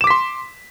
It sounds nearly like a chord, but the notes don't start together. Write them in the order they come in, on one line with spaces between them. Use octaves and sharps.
E7 D6 B6 C6